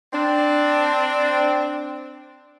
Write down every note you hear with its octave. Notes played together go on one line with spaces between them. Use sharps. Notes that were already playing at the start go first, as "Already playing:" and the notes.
C4 D4